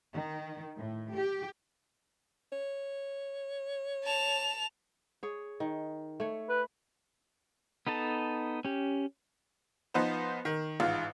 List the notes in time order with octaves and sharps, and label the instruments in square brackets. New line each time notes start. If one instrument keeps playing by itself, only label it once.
[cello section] D#3
A2
G4
[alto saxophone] C#5
[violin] A5 F7
[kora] G#4 C#5
D#3
A3 C#5
[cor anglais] B4
[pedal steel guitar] B3 D#4 A4 A5
C#4 G4
[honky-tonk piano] F3 B3 D#4 B4 C5
D#3
A1 G#2 F4